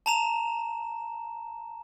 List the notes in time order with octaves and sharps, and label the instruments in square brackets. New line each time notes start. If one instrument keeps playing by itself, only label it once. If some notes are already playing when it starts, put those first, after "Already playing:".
[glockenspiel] A5 A#5 E7